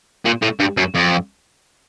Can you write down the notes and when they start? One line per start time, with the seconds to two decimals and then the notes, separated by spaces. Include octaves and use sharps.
0.25 A#2
0.42 A2
0.59 G2
0.77 F#2
0.94 F2